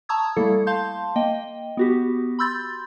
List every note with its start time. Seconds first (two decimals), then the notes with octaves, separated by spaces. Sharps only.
0.09 A5 A#5 C#6 D#6 E6 G#6
0.36 G3 A3 A#3 E4 A4
0.67 F5 A5 C6 G6
1.16 A#3 D#5 G5
1.77 B3 F#4 G4
2.39 B5 C6 E6 G6 A6